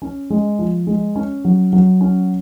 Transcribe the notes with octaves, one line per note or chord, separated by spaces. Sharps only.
C#4
G#3
F3
G#3
C#4
F#3
F#3
C#4